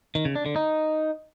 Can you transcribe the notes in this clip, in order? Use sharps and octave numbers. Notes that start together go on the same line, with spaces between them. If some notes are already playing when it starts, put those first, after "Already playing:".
D#3
C#3
D4
D3
D#4